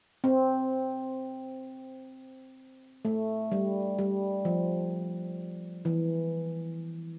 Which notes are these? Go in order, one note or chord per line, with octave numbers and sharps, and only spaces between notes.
C4
A3
G3
G3
F3
E3